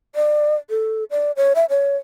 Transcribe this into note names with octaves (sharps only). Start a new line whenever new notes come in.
D5
A4
D5
C#5
E5
C#5